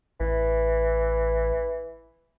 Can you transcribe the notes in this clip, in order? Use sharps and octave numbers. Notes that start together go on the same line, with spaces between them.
A1 E3